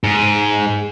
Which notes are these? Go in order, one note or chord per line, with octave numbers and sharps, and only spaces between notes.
G#2